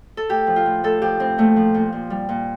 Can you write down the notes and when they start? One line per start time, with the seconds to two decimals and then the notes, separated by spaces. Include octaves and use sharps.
0.17 A4
0.29 A2 G4
0.47 F3
0.56 F4
0.66 A2
0.84 A2 A4
1.02 F3 G4
1.20 A2 C4
1.38 A#2 A3
1.56 F3
1.74 A#2
1.93 A#2
2.10 G3
2.29 A#2